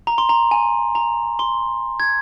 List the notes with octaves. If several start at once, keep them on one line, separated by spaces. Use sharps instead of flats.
A#5
C6
A#5
G#5
A#5
C6
G#6